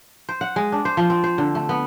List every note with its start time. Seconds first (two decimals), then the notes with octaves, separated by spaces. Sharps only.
0.29 C5
0.41 F#5
0.56 G#3
0.72 D4
0.85 C5
0.97 F3
1.10 C4
1.24 C5
1.38 D3
1.55 A3
1.69 B3